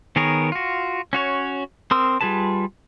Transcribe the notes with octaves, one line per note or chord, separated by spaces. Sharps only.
D#3 B3 G#4 A#4 C#5
F4 F#4
C#4 F#4 C#5
C4 A#4 C6 D#6 E6
G3 F4 G#4 B4 A5